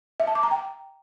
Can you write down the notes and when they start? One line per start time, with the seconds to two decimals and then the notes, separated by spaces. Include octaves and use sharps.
0.20 E5
0.27 A5
0.35 D6
0.43 A#5
0.51 G5